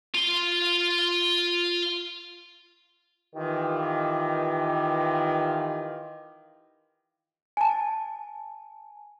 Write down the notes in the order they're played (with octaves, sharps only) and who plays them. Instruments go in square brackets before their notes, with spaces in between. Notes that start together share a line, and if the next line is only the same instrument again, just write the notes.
[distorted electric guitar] F4 C6
[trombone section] D#3 E3 F4 G4
[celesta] G#5 A5